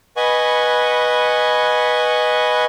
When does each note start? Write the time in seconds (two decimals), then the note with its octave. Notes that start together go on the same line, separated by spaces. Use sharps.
0.17 B4 D#5 F#5 G#5 B5 C#6